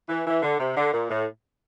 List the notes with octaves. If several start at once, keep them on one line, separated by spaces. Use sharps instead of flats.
E3
E3
D3
C3
D3
A#2
A2